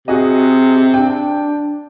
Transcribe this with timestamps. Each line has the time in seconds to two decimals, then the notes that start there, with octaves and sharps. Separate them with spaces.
0.08 C3 F#4 G#4 D#5
0.94 D4 G5